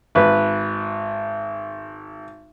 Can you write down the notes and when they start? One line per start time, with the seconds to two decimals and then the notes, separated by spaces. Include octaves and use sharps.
0.15 G#1 B4